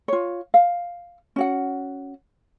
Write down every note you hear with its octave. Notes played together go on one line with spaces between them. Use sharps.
F4 C#5
F5
C#4 F#4 F#5